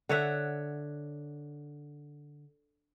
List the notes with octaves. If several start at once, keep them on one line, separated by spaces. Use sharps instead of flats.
D3 C#5 E5 F#5